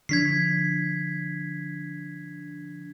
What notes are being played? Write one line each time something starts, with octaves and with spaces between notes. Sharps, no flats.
D3 F3 D4 G#6 B6 C7